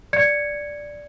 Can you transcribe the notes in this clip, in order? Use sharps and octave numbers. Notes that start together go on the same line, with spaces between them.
D5 G#6 C#7